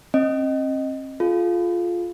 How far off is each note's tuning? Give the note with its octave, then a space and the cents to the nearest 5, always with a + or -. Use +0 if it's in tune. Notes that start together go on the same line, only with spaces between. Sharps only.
C4 +40 D#5 +0
F4 +0 G#4 +45